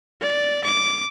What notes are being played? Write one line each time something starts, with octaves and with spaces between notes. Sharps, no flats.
D5
D6